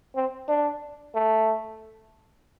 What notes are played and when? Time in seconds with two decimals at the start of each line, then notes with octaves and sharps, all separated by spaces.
0.15 C4
0.48 D4
1.15 A3